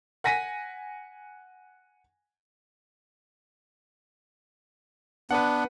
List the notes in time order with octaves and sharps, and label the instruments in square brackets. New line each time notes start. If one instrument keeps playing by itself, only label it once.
[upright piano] F#5 G#5 A#6 B6 D#7
[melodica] B3 D4 [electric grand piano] B4 F#5